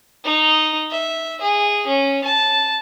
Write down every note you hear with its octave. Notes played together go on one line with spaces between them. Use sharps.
D#4
E5
G#4
C#4
A5